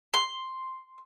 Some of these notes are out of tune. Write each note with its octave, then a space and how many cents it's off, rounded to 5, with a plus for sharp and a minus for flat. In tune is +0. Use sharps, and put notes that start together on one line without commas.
C6 +0